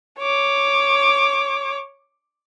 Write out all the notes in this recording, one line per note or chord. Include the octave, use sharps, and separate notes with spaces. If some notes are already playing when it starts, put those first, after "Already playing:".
C#5 D6